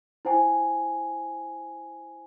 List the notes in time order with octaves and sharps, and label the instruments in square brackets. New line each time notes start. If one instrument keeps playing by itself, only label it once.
[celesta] E4 C5 G5 G#5